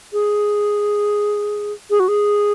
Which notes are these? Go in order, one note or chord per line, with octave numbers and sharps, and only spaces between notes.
G#4
G#4
F#4
G#4